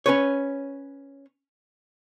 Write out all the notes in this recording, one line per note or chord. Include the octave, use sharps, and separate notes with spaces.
C#4 B4 C#5